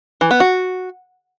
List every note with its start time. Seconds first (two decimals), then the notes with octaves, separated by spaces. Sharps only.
0.21 E3
0.31 B3
0.40 F#4